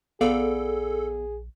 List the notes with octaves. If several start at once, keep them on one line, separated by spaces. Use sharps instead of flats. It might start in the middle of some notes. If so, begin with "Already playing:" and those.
A#1 B3 G#4 A4 D5 F5